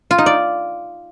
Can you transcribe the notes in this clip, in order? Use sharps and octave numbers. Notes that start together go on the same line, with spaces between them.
F4
D#4
D5